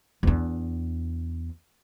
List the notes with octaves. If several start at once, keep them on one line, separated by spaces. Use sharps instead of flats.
E2 D4